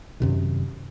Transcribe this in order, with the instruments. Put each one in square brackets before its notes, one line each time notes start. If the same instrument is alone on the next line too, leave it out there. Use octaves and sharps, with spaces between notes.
[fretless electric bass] F#2 C3 D#3